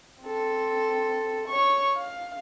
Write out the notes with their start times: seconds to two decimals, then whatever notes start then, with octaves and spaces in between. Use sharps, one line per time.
0.23 C4 A4
1.49 C#5 C#6
1.96 F5